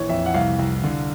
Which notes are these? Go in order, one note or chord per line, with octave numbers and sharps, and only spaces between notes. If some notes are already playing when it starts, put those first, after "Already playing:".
Already playing: A#1 E3 C#5
F2 E5
F#5
C2 F5
C2
D3